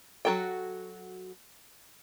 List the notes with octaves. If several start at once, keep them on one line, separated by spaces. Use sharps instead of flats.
F#3 E4 F#4 A4 G5